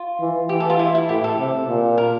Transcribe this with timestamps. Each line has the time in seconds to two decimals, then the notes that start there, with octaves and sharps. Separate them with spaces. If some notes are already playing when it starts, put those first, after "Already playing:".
Already playing: F4
0.20 E3
0.49 E3 G4
0.60 A4
0.70 F4
0.79 E4
0.95 E4
1.09 A2 G4
1.24 A4
1.39 C3
1.68 A#2
1.98 A#4